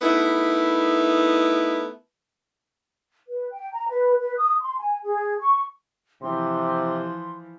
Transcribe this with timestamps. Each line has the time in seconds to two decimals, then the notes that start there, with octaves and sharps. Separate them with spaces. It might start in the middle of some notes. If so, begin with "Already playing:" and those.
0.02 A3 B3 D#4 E4 A#4
3.28 B4
3.53 G5
3.72 A#5
3.88 B4
4.19 B4
4.37 D#6
4.61 C6
4.78 G#5
5.03 G#4
5.40 C#6
6.22 C3 E3 F3 C6